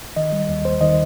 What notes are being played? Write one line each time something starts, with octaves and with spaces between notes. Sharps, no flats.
D#3 D#5
G3
D#2
D#2 C5
D#3 D#5